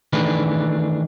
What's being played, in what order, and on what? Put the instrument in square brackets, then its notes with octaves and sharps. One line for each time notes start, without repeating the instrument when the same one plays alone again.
[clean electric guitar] D#3 E3 A3 D4 G#4 B4